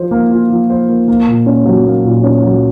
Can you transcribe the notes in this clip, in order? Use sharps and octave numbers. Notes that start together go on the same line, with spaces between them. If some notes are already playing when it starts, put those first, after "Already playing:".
Already playing: F3 F4 C5
A#3
F4
F3
C5
A#3
A#3
A#2
C#4
F#3
A#3
A#2
C#4
F#3